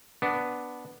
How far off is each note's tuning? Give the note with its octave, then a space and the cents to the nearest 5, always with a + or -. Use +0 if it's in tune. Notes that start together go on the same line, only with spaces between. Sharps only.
B3 +0 D4 +0